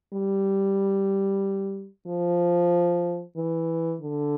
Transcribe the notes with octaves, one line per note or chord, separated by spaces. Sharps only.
G3
F3
E3
D3